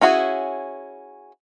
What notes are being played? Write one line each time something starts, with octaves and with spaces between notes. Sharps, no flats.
C#4 E4 F#4 G#4